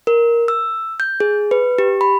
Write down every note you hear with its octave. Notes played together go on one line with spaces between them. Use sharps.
A#4
E6
G6
G#4
B4
G4
B5